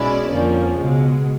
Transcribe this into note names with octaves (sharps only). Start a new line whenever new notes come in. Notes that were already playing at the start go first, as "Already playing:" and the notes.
Already playing: B1 B2 G#3 C#4 E4 D5
F2 D3 F3 A#3 C#4
C#2 B2 G#3